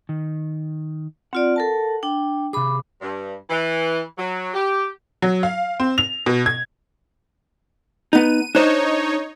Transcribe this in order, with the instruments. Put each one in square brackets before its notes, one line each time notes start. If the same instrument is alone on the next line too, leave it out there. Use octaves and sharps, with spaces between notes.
[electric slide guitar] D#3
[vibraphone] C4 F4 D5 [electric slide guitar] F#5
[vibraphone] A4 A#4 A5
D4 G5
[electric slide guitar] C3 G#4 [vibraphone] B5 D6
[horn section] G2
E3
F#3
G4
[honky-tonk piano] F#3
F5
C4
F7
B2
G#6
[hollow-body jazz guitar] B3 D#4 [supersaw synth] D#7
[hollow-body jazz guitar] D4 C5 D#5 [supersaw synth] D#4 C#5